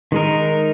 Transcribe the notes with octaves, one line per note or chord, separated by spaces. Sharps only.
D#3 G#3 D#4 A#4